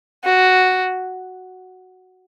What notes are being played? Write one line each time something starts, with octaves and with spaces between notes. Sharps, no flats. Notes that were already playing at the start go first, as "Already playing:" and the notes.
F#4